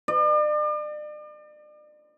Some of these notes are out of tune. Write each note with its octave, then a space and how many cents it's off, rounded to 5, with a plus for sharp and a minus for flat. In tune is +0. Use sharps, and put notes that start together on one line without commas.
D5 +40